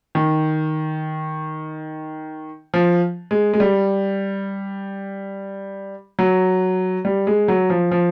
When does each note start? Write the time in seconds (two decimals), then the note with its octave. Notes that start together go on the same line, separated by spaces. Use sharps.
0.15 D#3
2.74 F3
3.31 G#3
3.53 G#3
3.60 G3
6.19 F#3
7.05 G3
7.27 G#3
7.48 F#3
7.70 F3
7.91 F3